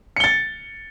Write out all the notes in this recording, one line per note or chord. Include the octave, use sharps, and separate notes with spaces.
A6 C#7 G7